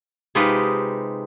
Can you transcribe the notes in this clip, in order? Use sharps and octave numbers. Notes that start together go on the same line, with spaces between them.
C3 G#3 D#4 F4 G4 B4